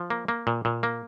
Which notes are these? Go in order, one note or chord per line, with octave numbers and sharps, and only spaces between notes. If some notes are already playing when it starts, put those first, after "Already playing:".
Already playing: F3
A#3
A#3
A#2
A#2
A#3